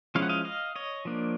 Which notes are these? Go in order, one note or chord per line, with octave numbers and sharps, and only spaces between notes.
F3 G#3 C#4 E4 F5
F#5
D#5 F5
D#5 F5
C#5 D#5
F3 A#3 D4